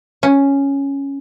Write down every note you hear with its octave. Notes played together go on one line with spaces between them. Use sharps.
C#4